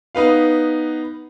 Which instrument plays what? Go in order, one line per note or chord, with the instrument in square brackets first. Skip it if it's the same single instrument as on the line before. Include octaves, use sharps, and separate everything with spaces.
[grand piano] B3 D#4 B4 F5